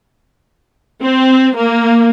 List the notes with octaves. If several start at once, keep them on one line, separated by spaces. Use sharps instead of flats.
C4
A#3